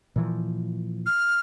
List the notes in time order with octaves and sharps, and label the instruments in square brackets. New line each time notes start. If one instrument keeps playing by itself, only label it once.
[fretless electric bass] A#2 E3 F3
[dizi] F6